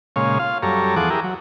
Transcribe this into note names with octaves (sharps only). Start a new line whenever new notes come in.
A#2 C#3 G#3 C#5 F5
F4 F5
F#2 G3 A4 C#5 A#5
E2 F3 G#4 A4 F#5 D6
E4 G4 G#4 A#4
F#3